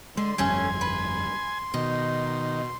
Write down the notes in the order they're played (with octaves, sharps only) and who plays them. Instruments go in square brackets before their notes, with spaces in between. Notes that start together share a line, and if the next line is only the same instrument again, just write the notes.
[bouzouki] D3 [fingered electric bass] G#3 [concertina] C6
[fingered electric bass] G1 F2 G3 [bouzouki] A3 C#4 [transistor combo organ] G#5
[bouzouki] B4
[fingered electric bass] B2 [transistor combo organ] D#3 [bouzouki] D#4